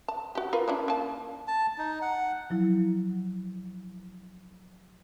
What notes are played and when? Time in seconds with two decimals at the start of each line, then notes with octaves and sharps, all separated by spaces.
0.08 A5
0.35 F#4 G4
0.53 F4 A#4 B4
0.68 C#4 D4 E4
0.88 A#3 A5
1.48 A5
1.78 D#4
2.02 F#5
2.50 F3 F#3 E4